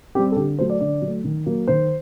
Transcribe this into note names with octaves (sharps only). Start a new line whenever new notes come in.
G3 C4 G4
A4
D3 G4
F#3 A3 C5
D5
D3 D5
F#3
A3
D#3
F#3 A#3
D#3 C5